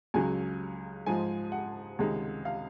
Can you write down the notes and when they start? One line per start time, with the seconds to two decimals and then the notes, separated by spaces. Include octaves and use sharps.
0.14 C#2 C#3 F#3 G#5
1.06 G#2 F3 G#3 G#5
1.52 F#5
1.99 C#2 C3 D#3 G#3
2.45 F5